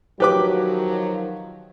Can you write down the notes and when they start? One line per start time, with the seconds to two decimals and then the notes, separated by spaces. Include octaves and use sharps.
0.20 D#3 F3 F#3 G4 B4 D6